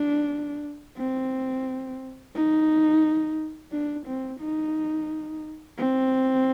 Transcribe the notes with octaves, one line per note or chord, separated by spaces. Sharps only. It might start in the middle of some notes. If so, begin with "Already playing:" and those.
Already playing: D4
C4
D#4
D4
C4
D#4
C4